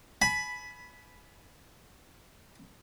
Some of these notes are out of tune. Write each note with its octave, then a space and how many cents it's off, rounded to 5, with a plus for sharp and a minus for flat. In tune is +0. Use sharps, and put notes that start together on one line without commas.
G#5 +35 B5 +0